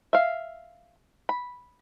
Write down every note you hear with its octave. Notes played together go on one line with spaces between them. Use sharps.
E5 F5
B5